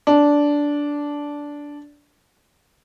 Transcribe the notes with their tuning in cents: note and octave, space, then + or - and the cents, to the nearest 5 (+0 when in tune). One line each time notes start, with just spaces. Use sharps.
D4 -10